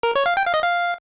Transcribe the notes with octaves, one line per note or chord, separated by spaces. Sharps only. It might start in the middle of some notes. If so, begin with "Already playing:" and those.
A#4
C#5
F5
G5
F5
D#5
F5